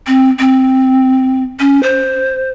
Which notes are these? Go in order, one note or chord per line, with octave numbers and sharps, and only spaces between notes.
C4
C4
C#4
C5